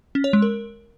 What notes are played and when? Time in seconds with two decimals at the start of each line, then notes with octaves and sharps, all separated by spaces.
0.15 C#4
0.24 C#5
0.33 G#3
0.42 A#4